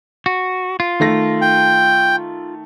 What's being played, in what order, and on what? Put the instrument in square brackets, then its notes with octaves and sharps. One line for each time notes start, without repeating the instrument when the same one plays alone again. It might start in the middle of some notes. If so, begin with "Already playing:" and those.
[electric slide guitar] F#4
F4
[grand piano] D#3 A3 A#6
[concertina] G5